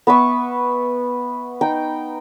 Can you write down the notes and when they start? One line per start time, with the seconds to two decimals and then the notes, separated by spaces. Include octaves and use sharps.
0.07 B3 B4 E5 C#6
1.61 D#4 G5